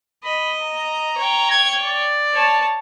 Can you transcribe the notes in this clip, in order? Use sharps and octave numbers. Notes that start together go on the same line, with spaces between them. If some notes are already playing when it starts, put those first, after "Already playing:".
D#5 B5
A#5
C#5 G5
G#6
D5
C#5 A5